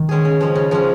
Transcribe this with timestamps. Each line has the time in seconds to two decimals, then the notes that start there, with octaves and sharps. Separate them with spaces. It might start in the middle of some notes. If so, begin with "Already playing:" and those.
Already playing: D#3
0.09 G#3 C#4 G#4
0.25 C#3
0.41 F3 G#3 C#4
0.55 C#3
0.71 F3 G#3 C#4